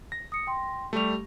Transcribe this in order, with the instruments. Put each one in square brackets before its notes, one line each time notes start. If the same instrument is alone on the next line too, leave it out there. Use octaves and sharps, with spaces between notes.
[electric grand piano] A#6
[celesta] D#6 C#7
G5 C6
[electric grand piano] G3 A3 [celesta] G4 C#6 F7